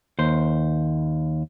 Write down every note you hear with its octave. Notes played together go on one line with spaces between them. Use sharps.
D#2 C5